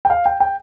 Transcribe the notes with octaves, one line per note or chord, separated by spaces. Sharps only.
G5
F5
G5
G5